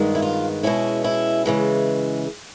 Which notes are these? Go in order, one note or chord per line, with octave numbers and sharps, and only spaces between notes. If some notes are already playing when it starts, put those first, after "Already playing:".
Already playing: G2 D#3 G#3 B3
E4
F4
B2 G#3 C#4 E4
E4
C#3 E3 G#3